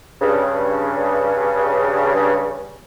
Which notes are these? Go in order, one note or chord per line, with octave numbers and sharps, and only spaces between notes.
G2 C#3